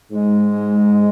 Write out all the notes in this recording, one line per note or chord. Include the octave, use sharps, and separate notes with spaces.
G#2 G#3